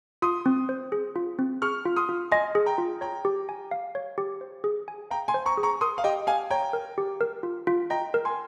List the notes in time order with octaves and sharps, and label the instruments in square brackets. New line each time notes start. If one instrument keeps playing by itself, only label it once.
[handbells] F4 [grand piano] C6 D#6
[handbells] C4
C5
G#4
F4
C4
[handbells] G#4 [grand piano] C#6 F6
[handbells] F4
[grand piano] C6 D#6
[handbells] F4
[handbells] D#5 [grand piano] G#5 C6
[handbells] G#4
[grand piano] G5 A#5
[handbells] F4
[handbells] C#5 [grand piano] G5 A#5
[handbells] G4
G#5
F5
C#5
G4
C5
G#4
G#5
[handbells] F5 [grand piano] G5 A#5
[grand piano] G#5 C6
[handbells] C5
[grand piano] A#5 C#6
[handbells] G#4
[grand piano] A#5 C#6
[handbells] A#4 [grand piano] C6 D#6
[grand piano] F5
[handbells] G4 [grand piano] D#5 G5
[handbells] G4 [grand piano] F5 G#5
[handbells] C#5 [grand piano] G5 A#5
[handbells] A#4
G4
A#4
F4
F4
[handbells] D#5 [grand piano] G5 A#5
[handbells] A#4
[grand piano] G#5 C6